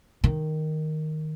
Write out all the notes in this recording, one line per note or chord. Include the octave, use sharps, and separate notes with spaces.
D#3